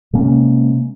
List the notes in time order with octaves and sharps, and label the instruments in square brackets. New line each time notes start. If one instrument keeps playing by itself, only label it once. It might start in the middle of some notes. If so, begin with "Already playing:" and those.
[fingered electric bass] C3 G#3 A#3 C#4